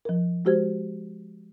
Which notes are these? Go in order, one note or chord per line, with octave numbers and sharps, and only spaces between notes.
F3 A#4
G#3 F#4 G4 C5 G#6